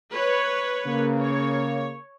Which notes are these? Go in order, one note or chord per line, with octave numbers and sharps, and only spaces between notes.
B4 C#5
C#3 A#3
C#5